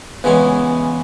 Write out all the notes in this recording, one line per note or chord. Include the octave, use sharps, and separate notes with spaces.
C#3 E3 G#3 B3 C#4 G#4